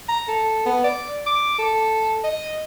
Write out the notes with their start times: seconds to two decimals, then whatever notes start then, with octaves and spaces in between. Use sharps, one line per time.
0.09 A#5
0.28 A4
0.66 B3
0.84 D5
1.26 D6
1.58 A4
2.24 D#5